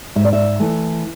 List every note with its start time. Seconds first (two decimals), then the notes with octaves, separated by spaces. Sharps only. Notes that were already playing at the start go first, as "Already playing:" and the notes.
0.16 G#2 E5
0.25 D5
0.33 E5
0.60 E3 A3